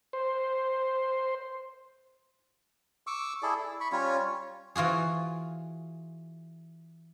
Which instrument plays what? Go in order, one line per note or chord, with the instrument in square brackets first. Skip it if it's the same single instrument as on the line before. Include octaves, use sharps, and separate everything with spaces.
[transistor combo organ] C5
[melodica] C#6 D6 E6
E4 G#4 A4 D5
E4
B5 C#6
G3 C#4 F4 C#5
[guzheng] E3 F4 F#4 G#4